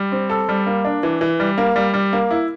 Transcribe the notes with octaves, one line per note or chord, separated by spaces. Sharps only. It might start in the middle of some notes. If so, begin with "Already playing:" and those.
Already playing: G3
C4
A4
G3
A#3
D4
E3
E3
G3
A#3
G3
G3
A#3
E4